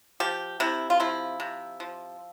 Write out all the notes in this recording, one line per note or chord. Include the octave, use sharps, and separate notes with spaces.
F3 G4
C3 E4
F4
F3 E4
C3
F3